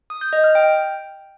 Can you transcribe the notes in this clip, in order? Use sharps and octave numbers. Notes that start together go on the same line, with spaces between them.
D#6
G6
D#5
F6
G5